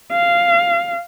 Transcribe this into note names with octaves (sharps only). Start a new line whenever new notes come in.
F5